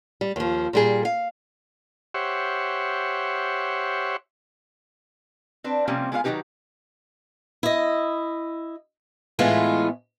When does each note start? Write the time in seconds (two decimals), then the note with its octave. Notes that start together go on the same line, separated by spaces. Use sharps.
0.21 G3
0.36 D#2 F3
0.73 A#2 G3 G#4
1.05 F5
2.14 G4 C5 C#5 E5 F#5
5.64 C4 D4 B4
5.88 C3 F3 G3 A#3 C4 C#4
6.12 G#3 B3 F4 G#4 C5 F5
6.24 D#3 F#3 G3 D#4 G4 B4
7.63 E4 D#5
9.39 A2 E3 G#3 A3 B3 F4